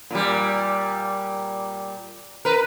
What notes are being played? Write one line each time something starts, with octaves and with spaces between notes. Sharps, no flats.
A#2 G3
A#4 B4